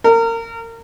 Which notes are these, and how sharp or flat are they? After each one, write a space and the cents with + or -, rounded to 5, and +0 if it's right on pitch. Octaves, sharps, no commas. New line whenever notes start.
A#4 -30